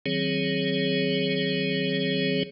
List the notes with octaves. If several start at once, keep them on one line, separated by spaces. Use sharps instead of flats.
D#3 F#3 C4 G#4 C#5